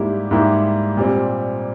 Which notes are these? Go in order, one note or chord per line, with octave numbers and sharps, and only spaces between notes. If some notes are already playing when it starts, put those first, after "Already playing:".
Already playing: G#2 G3 A#3 E4 G4
G#2 G3 A#3 E4 G4
A#2 G3 C4